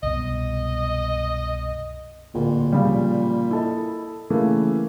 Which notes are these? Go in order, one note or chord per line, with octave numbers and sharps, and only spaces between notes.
C2 F#2 B2 D#5
D1 A#2
C#3 F3 G3
E4 A4 D#5
C#3 E3 A3 A#3